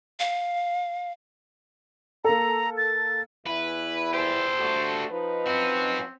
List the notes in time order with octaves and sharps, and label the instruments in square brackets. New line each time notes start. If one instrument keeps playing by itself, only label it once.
[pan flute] F5
[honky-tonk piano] A#3 A4 [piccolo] A#5
[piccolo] A6
[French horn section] E2 E4 [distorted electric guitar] B4
[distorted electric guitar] G4 A4 [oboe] C5
[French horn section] D3 A3 F#4
F3 D#4 B4
[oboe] C4 [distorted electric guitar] C#4 F#4